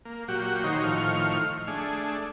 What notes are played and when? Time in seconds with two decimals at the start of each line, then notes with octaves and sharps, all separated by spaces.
0.05 A#3
0.28 A#2 F#3 F#4 G4
0.64 D#3 D#4 C5 C#5
0.83 A2 D#3 F3 C#6 F6
1.67 A3 D4 G#4